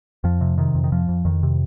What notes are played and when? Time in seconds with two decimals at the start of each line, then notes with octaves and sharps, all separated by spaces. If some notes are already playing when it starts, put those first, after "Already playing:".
0.24 F2 F3
0.41 C3
0.58 C3 D#3
0.75 F2
0.84 D#3
0.92 F2 F3
1.09 F2
1.25 F2 D#3
1.43 C3